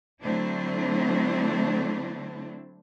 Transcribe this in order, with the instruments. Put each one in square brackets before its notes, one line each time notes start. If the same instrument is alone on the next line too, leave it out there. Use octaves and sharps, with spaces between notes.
[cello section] D3 F#3 A3 C4 D4 E4